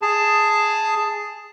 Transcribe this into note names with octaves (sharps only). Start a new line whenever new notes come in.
G#4 A5